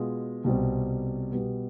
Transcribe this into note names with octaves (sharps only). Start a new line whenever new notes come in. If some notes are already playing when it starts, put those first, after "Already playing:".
Already playing: B2 G#3 B3 F4
C2 B2 G3 C4
B2 G3 B3